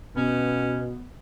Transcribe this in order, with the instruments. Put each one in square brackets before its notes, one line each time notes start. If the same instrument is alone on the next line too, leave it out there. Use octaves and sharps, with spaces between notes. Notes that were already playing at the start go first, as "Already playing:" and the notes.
[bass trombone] B2 [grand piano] B3 [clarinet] C#4 [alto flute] B4